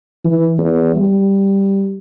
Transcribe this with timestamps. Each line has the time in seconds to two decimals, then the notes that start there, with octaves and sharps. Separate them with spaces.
0.24 E3
0.58 E2
0.95 G3